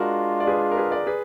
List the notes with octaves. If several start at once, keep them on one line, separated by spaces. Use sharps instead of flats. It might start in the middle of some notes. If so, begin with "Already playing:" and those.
Already playing: G#3 D4 F4 F#4 A#4
D5
G#4 B4
A#4
G#4 B4
A#4 D5
G#4 B4